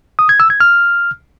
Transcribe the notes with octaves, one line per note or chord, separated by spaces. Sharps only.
D#6
G#6
E6
G#6
F6